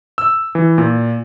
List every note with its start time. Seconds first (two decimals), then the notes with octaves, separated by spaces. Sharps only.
0.18 E6
0.55 E3
0.78 A#2